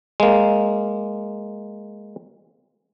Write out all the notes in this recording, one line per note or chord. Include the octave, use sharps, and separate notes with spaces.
G#3 A#3